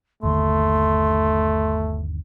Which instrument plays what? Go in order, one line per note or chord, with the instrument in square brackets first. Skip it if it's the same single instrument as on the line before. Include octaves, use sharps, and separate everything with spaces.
[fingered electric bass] G1 D#2 D3 [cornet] A3 [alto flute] C6